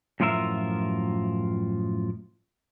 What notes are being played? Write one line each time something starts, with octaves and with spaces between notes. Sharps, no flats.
F#2 A2 F3 F4 A#4 E5